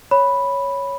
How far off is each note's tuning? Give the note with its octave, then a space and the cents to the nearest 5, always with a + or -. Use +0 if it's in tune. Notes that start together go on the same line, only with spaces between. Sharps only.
C#5 +0 B5 +0